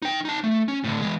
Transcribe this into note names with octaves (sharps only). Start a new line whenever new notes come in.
D#4 G5
D#4 A5
A3
C#4
A2 D3
E3 G#3